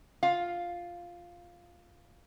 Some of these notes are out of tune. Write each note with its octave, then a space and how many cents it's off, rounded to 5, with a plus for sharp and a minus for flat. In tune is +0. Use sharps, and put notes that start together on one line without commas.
F4 +0 F5 +0